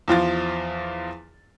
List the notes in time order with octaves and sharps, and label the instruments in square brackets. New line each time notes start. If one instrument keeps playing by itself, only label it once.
[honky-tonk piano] E2 F3 F4 A6